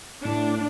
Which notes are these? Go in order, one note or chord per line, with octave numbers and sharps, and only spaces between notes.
A2 D4